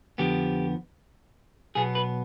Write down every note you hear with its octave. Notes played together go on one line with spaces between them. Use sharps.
F2 D3 F3 B3 G4
B1 B2 B3 G#4
B4